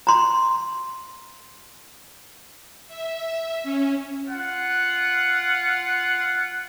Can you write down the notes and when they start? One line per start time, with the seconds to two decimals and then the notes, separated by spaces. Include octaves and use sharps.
0.07 A#5 C6
2.88 E5
3.63 C#4
4.27 F4 F#5